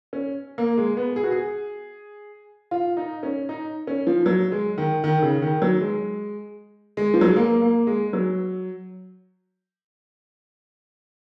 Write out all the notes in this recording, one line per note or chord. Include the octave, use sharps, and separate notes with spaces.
C#4
A#3
G#3
B3
G#4
F#4
G#4
F4
D#4
C#4
D#4
C#4
F3
F#3
G#3
D#3
D#3
C#3
D#3
F#3
G#3
G#3
F3
F#3
G#3
A#3
A#3
G#3
F#3